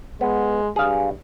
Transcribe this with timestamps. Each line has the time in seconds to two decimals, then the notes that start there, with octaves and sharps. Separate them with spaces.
0.21 G#3 B3
0.76 G2 G#4 F5